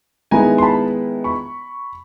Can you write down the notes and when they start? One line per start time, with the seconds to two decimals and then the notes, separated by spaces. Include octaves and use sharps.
0.31 D#3 G#3 B3 E4 G#5 A#5
0.58 C6
0.63 A5 B5
1.24 B5 C#6